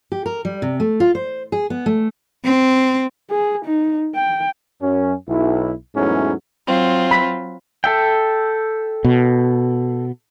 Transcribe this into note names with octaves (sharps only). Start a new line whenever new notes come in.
G4
A#4
G3
C3
A3
F4
C5
G#4
B3
A3
C4
G#4
D#4
G5
F#2 C#4
B1 E4
E2 G#2 E3 F#3 A3 C#4
F#3 C4 F4
B5
A4 E5 G5
B2